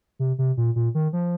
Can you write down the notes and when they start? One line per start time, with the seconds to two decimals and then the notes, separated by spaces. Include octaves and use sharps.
0.19 C3
0.38 C3
0.57 A#2
0.76 A#2
0.95 D#3
1.13 F3